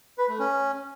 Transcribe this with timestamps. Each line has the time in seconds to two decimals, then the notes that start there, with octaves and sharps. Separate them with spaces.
0.18 B4
0.29 A3
0.39 C#4